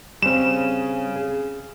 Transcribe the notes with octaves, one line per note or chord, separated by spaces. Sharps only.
C#3 G3 C4 E7
G#4